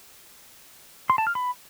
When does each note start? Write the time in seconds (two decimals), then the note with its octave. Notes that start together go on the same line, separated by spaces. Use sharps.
1.10 C6
1.18 A5
1.27 F6
1.35 B5